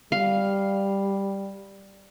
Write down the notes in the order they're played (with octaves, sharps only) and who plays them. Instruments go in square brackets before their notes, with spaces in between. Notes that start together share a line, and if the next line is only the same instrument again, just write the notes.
[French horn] G3 [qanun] F5